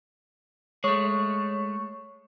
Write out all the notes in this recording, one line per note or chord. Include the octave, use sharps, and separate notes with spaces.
G#3 A3 C#5 C#6